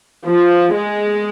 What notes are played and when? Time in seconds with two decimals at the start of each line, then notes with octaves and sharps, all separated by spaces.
0.25 F3
0.74 G#3